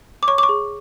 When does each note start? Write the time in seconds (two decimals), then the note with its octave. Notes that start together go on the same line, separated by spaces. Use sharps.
0.23 D6
0.28 C#5 C#6
0.38 D6
0.43 C#6
0.49 G#4